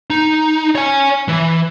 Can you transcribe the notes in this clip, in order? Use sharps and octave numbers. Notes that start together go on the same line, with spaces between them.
D#4
C#5 G#5
E3